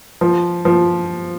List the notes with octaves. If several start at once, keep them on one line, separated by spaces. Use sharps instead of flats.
F3
F3